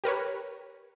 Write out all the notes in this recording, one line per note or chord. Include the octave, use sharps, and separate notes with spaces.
G4 A#4 B4 C#5